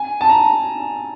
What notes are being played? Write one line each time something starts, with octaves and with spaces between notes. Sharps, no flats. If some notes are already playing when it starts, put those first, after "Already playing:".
Already playing: G#5
A5
A#5